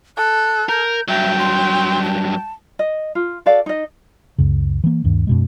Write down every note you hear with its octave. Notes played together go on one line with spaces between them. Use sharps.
A4 F#6
A#4 G6
G2 F#3 E5 G5
C6
A5
D#5
F4
F#4 A4 D5 F5
D#4 D#5
C#2 F#2 C#3
E3 A#3
D2 G2 D#3
F#2 B2 G#3